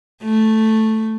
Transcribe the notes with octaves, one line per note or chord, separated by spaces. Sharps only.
A3